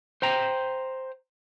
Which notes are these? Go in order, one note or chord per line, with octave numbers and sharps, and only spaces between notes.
C5 G5 A#5